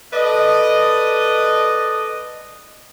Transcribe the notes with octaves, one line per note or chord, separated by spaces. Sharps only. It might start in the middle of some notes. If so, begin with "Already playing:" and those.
A4 B4 D5 D#5